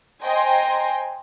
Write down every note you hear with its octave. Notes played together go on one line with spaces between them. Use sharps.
C5 D#5 G5 G#5 A#5 C6